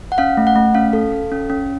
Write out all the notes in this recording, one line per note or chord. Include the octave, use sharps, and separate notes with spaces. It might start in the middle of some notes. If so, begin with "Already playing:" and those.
F#5
C#4 F5
A3
F#5
A3
C#4 F5
A4
A4
C#4
C#4